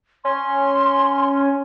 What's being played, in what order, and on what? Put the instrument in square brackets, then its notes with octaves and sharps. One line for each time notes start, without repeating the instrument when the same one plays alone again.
[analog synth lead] C#4 [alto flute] C6